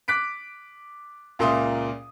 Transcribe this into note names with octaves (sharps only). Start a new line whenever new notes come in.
D6 F#6 B6 D7
C#2 A#2 A#3 E5 C6 D#6